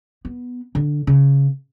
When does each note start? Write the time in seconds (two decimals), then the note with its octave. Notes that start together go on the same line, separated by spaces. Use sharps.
0.25 B3
0.75 D3
1.07 C#3